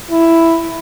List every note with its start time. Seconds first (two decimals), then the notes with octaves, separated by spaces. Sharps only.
0.11 E4